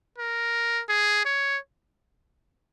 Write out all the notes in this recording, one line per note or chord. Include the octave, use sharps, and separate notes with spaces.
A#4
G#4
C#5